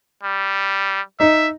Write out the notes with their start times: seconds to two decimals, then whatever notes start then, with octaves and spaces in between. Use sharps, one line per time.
0.23 G3
1.20 D#4 E5